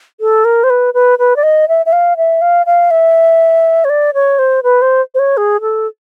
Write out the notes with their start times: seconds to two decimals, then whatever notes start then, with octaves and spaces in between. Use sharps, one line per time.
0.21 A4
0.45 A#4
0.64 C5
0.70 B4
0.94 B4
1.19 B4
1.36 D5
1.43 D#5
1.68 E5
1.86 E5
1.92 F5
2.17 E5
2.42 F5
2.66 F5
2.91 E5
3.85 C#5
3.90 D5
4.14 C#5
4.39 C5
4.63 B4
4.82 C5
5.15 C5
5.19 C#5
5.37 G#4
5.61 A4